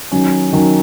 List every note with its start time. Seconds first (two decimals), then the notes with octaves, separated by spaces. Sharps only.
0.11 D#3 F#3 C#4
0.53 D#3 F#3 C#4